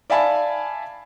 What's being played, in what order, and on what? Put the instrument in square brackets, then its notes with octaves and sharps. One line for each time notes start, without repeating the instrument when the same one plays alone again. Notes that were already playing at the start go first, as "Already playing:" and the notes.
[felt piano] D5 E5 F5 G#5 A5 B5